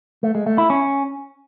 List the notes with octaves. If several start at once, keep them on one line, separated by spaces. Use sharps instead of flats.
A3
G#3
A3
E4
C#4